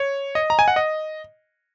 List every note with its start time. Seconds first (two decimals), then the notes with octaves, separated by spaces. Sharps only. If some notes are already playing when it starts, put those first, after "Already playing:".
Already playing: C#5
0.35 D#5
0.50 A#5
0.59 G#5
0.68 F#5
0.76 D#5